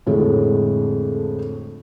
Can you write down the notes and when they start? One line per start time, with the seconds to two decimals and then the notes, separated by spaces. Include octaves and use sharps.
0.06 F2 A2 D3 G#3 A3